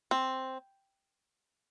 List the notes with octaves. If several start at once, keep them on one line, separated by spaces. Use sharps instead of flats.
C4